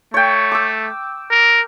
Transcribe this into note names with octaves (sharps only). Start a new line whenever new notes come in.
A3 C#5 G5
D6 E6
A#4